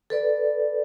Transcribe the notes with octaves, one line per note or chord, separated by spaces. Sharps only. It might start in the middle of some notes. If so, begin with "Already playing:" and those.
A4 B4 D5